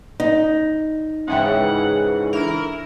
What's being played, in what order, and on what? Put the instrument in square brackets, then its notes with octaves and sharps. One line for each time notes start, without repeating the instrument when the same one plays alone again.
[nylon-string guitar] D#4
[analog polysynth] G#2 C#3 E3 [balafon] C#4 E5 G5 [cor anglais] F#5
[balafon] D4 A4 [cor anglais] E4 [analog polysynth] A#4